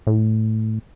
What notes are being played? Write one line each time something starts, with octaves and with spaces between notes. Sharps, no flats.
A2